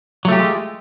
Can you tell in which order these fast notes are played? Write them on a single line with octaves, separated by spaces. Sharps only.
F#3 A3 G4 F4 G#3